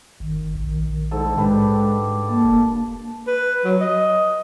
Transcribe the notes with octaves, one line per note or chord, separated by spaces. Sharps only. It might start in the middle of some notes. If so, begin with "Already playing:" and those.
G1 D#3
A#1
G#2 D3 A4
G#2 G#3 D4 G4 B4
A#3 A5
E1
B4
F#3
D#5